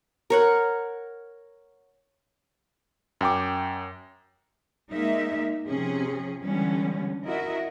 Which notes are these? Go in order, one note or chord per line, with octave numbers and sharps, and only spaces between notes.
A#4 C#5 F#5
F#2 G5 D6
G#3 A#3 D#4 E5
C3 F3 C#4 G#4
D3 E3 G3 G#3 B3 C#4
E4 F#4 A#4 D#5 E5